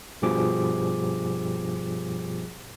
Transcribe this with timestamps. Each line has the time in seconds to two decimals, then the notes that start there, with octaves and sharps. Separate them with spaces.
0.22 G2 B2 F3 G4 G#4 D6